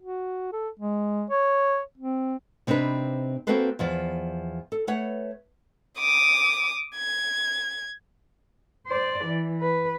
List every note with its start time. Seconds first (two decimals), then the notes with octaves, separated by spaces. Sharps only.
0.02 F#4
0.52 A4
0.79 G#3
1.30 C#5
1.98 C4
2.67 C3 C4 D4 D#4 B4
3.47 A#3 C4 F#4 A4 B4 C5
3.79 E2 F3 D5
4.72 A4
4.87 A3 B4 C#5 F#5
5.99 D6 D#6
6.96 G#6
8.87 C5 D5
9.25 E3
9.61 B4